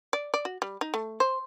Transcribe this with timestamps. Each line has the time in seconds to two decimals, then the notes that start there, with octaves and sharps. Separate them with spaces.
0.13 D5
0.34 D5
0.45 F#4
0.62 G3
0.81 D#4
0.94 A3
1.20 C5